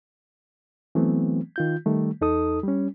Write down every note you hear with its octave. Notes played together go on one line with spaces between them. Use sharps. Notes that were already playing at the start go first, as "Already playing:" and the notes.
E3 F#3 A3 B3 C4
D#3 F4 G6
D#3 G3 A3
E2 D#4 A4 D#6
G3 C#4